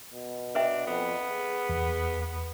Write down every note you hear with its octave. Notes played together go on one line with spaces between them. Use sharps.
B2
D4 B4 E5 G5
F2 B3
G#4
E2
B3